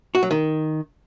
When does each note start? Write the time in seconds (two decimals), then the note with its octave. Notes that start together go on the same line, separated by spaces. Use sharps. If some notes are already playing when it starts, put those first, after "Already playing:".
0.15 F#4
0.23 F#3
0.31 D#3